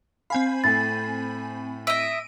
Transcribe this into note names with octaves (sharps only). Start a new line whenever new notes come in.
C4 F5 G#5 B5
A2 A3 A6
D#5 E5 D7 D#7